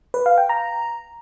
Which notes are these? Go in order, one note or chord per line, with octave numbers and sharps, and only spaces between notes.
B4
F5
G5
A#5